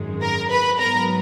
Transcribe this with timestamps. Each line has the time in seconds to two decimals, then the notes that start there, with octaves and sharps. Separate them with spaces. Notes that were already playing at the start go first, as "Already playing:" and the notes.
Already playing: G#1 F#2 D#3 G#3
0.22 A#4 A#5
0.50 B4 B5
0.79 G#2 F#3 B3 A#4 A#5